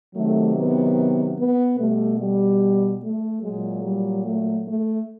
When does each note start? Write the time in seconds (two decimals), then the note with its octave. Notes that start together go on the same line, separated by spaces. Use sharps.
0.15 C3 D#3 F#3 A3
0.56 B3
1.38 B3
1.78 B2 G3 A3
2.19 G3
3.02 A3
3.42 A#2 F#3 G#3
3.83 G3
4.24 A3
4.65 A3